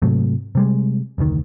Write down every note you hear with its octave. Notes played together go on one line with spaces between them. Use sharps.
G#2 C3 F#3 A3
C3 G3 G#3
F1 D2 A2 D#3